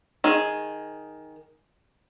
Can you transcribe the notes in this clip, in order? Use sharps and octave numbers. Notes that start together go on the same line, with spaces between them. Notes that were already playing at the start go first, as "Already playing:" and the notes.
D#3 G#4